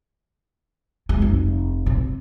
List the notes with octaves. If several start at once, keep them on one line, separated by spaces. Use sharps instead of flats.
G#3
F1
C3